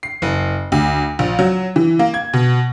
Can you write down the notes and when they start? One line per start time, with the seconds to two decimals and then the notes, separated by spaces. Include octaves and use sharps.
0.03 C7
0.22 F#1
0.72 D2
1.19 A#1
1.39 F#3
1.76 E3
1.99 A#3
2.14 G#6
2.33 B2